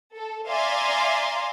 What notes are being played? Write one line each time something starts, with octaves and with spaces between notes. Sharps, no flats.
A4
D5 E5 F5 G#5 A#5 C6